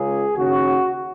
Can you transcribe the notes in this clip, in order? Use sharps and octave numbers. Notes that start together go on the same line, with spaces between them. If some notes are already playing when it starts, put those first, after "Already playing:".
Already playing: C#2 C#3 G#4
D#2 C#3 F#4